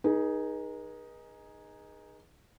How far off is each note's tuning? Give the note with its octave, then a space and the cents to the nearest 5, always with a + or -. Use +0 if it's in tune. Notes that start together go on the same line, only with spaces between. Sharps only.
D#4 +0 G#4 +0 B4 -45